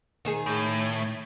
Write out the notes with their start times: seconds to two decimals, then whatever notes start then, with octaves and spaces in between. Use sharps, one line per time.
0.25 D#3 D#4 G#4
0.46 A2